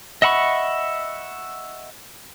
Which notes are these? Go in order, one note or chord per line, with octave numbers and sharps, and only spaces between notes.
D#5 E5 F#5 B5 C#6